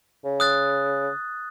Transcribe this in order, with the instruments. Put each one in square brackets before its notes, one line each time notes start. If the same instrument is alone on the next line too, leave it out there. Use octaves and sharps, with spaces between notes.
[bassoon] C#3
[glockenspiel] D#6 F#6 A6